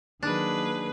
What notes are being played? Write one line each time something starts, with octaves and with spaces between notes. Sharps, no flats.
D#3 F#3 A#3 D4 G#4 B4